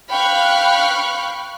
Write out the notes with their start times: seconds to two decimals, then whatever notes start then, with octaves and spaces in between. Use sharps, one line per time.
0.11 F5 G5 B5 C#6 F6 F#6